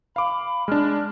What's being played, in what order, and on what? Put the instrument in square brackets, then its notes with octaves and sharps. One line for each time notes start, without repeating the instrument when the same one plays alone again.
[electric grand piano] F5 D6 [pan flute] B5
[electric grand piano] G#3 D4 [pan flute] F6